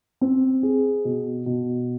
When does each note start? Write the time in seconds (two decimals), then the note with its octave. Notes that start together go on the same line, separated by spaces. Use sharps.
0.21 C4
0.63 G#4
1.05 B2
1.46 B2